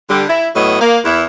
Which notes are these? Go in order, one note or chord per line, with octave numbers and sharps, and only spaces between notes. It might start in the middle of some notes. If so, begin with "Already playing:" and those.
D3 G3
E4
A2 F#3 B3 D#5
A#3
E2 E4